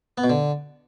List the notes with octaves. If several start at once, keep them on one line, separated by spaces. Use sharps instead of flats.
B3
B2
D3